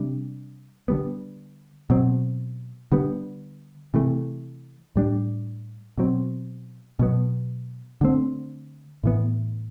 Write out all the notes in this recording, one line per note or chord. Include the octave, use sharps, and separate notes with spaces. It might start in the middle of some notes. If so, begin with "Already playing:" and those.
Already playing: C3 G3 D4
D3 G3 B3
B2 F#3 C4
D3 G3 B3
C3 E3 A3
A2 G3 D4
B2 F#3 C4
B2 F#3 B3
D3 A3 C4
A2 E3 B3